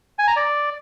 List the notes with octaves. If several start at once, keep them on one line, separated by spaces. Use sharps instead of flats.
G#5
A#5
D5